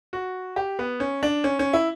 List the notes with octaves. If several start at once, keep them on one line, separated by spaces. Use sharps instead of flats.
F#4
G4
B3
C#4
D4
C#4
C#4
E4